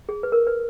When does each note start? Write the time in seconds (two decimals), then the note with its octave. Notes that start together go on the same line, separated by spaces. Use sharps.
0.09 G#4
0.23 B4
0.32 A#4
0.47 B4